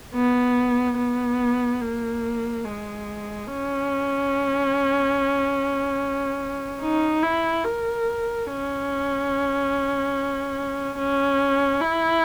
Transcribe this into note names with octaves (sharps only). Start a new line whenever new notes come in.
B3
B3
A#3
G#3
C#4
D#4
E4
A#4
C#4
C#4
E4